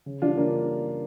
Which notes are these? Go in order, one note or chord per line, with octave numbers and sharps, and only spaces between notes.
C#3
E3 G3 D4 F4
C#3 A#3 D4